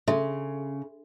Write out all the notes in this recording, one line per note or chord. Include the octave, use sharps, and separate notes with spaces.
C#3 A4 E5 C6